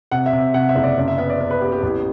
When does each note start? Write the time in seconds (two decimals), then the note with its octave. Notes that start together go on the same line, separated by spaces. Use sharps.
0.11 C3 F#5
0.26 E5
0.33 C3
0.40 E5
0.54 C3 F#5
0.69 E5
0.75 F#1
0.83 D5
0.97 F#2 D5
1.08 E5
1.18 B3 E5
1.30 D5
1.41 B3
1.50 B4
1.61 B3 G4
1.72 G4
1.83 A1 G4